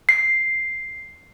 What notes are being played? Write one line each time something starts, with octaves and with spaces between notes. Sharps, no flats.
C7